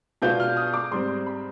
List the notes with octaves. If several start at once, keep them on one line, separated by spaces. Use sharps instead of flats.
B2 G#3 B3 D4 F4 G6
F6
D#6
D6
G#2 G3 C4 C6
C6
B5